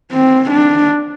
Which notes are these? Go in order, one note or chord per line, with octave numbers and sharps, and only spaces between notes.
C4
D4